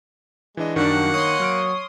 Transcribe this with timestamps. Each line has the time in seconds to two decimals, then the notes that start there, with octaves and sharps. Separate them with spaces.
0.57 E3 G#3 D4 D#5
0.76 F#2 D#3 G3 A#3 D4 F#4 F#5
1.14 C#5 C6 D#6
1.40 F#3 F6 D7